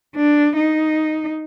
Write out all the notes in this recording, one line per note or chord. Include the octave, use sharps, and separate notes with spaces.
D4
D#4